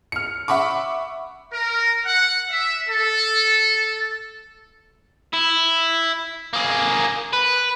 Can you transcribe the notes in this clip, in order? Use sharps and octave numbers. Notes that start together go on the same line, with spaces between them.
F6 C#7
E5 F#5 B5 C#6 D6
A#4
F#5
E5
A4
E4
A#3 G#4
B4